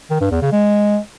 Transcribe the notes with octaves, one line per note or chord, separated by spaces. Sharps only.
D#3
G2
E2
C#3
G#3